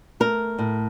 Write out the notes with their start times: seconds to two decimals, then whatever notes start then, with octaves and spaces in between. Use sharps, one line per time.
0.20 A3 A#4
0.59 A2